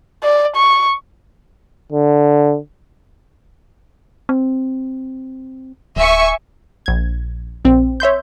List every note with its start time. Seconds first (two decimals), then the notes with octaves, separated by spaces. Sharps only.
0.23 D5
0.56 C#6
1.92 D3
4.29 C4
5.96 D1 E5 G#5 C#6
6.86 A#1 G#6
7.65 A#1 C4
8.00 C#5 E5 C6 G6